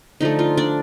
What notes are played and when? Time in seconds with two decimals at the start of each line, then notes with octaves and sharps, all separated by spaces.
0.21 D3 F3 A3 D#4
0.39 F4
0.57 D4 D5